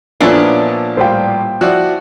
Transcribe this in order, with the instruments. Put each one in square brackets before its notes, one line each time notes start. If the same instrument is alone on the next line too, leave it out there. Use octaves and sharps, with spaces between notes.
[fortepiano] A#2 F3 [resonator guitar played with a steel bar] B3 C#4 D4 [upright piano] E4 A4 C#5
[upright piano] A2 G3 F4 [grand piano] C5 G5
[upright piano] F3 E4 D5 [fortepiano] F#4